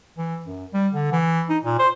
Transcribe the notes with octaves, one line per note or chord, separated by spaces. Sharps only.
E3
F#2
G3
D3
E3
D#4
A#2
C5